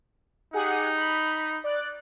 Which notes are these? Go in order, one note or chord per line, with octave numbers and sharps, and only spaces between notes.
D#4 G4 G#4 F#5
B5
D5 F#6